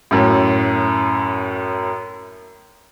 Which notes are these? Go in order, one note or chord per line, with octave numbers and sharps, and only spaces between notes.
F#2 A2